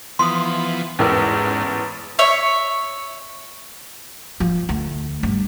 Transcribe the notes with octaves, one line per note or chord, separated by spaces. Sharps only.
E3 F3 B3 C6 D#6
A1 E2 G#2 C#4 A#4 B4
C#5 E5
F3
D2
G2